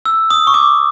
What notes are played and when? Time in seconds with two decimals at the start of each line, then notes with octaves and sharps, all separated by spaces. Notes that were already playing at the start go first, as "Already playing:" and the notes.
0.05 E6
0.30 D#6
0.47 C#6
0.54 D6